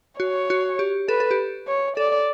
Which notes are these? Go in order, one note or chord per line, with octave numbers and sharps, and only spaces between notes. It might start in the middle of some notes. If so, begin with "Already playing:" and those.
F#4 C#5
F#4
G4
A4 B4
A4
G4
C#5
A4 D5